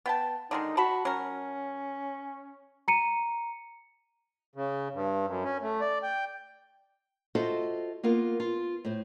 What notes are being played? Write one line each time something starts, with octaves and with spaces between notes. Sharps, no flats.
B3 G5 A5
D3 D#3 G#3 D#4
F#4 A5 B5
F#3 C#4 A#4
A#5 C#7 D#7
C#3
G2
F#2
C#4
A3
D5
G5
F4 F#4 A4 C5 D#5 E5
A#3 B3 F4 A#4
F4
A2 C5